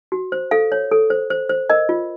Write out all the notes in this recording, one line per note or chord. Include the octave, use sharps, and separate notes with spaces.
F#4
C5
A4 F5
C#5
A4
C5
C5
C5
A#4 D#5
F4